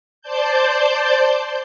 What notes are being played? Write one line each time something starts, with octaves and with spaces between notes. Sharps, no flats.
C5 D5 A5 G6